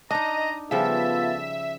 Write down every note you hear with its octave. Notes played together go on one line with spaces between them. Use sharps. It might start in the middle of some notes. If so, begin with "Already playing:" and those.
D4 D#4 D#5 A#5
C#3 F3 G3 B3 F4 A4 E5